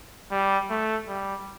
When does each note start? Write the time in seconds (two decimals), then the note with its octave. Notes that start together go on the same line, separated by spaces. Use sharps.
0.31 G3
0.70 A3
1.08 G3